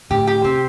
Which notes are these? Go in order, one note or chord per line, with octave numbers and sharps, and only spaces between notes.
A2 D3 G4
G4
C3 C4